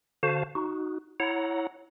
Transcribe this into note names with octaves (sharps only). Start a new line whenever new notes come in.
D3 F#4 C5 F5 A5
D#4 F#4
E4 C#5 F#5 A#5